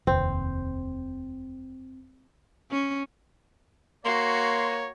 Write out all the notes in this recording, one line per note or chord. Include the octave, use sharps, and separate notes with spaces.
F1 D#2 C4
C#4
A#3 F#4 C#5 C6